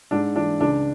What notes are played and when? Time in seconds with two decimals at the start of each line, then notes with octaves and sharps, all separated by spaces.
0.11 G#2 D4
0.36 E3 D4
0.60 C#2 D4